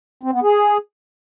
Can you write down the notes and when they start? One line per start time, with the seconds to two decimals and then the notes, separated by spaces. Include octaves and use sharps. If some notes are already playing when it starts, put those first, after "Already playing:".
0.23 C4
0.33 B3
0.43 G#4